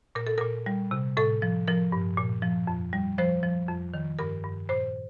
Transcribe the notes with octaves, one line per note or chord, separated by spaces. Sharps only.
A#2 A#4
A4
A#2 A#4
G3
C3
A2 A4
F3
F3 A#4
G2
A#2
F3
F2
G3
F3 C5
F3
F2
D#3
G2 A#4
G2
A#2 C5